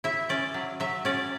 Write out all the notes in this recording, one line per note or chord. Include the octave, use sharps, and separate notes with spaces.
E4 E5
C#4 D5
F#3
F#3 E5
C#4 D5